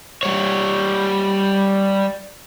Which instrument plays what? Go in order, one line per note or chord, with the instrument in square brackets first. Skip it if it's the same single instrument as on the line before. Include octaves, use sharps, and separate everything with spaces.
[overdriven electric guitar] G3 C#5